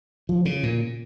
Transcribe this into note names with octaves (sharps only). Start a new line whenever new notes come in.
F3
C#3
A#2